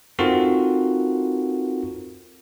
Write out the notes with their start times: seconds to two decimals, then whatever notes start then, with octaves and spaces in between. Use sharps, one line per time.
0.19 C4 D#4 F4 F#4 A4 A#4